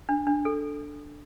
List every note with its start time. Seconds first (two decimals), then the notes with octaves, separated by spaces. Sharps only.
0.09 D4
0.27 D4
0.45 A4